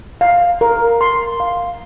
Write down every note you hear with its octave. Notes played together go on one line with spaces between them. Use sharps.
F5
A#4
C6
F5